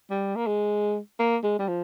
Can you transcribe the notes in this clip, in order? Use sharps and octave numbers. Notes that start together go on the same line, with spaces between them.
G3
A#3
G#3
A#3
G#3
G3
F3